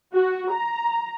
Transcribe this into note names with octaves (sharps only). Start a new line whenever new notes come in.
F#4
A#5